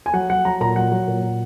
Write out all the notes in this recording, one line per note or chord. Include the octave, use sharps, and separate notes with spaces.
G#5
F#3 F#5
F#3 F#5
F#3 A#5
A#2 A#5
F#3 F#5
F#3
A#2
A#2